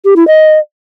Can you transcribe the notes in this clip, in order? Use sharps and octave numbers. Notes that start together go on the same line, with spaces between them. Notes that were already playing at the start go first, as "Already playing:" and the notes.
G4
E4
D#5